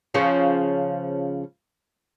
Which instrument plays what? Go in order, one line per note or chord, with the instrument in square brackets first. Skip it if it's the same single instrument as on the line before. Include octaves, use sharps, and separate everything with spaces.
[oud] C#3 F3 C#4